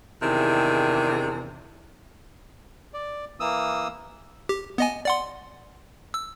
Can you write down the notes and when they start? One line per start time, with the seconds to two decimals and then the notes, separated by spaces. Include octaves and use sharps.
0.22 E2 C3 D#3 D4 E4 G#4
2.94 D5
3.40 E3 A#3 D#6 E6
4.49 G4
4.78 B3 D#5 G#5
5.05 D5 F#5 C6
6.14 E6